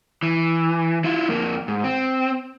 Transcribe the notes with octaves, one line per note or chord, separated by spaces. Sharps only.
E3
E4 F4
F2 A#3
G#2
C4